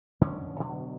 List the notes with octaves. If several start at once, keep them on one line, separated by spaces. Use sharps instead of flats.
F2 D3 C#4
B2 D3 F#3